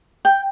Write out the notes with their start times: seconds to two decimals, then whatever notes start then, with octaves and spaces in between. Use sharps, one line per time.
0.25 G5